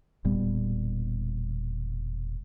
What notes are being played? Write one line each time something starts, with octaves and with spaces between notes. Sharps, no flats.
E1 A#2 G3 B3